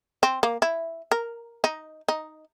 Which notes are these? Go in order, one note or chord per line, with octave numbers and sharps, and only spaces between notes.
C4
A#3
E4
A#4
D#4
D#4